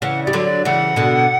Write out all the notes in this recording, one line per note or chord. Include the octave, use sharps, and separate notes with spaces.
C#3 E3 F#5
G3 D5
D3 F#3
D5
C#3 E3 F#5
B2 D3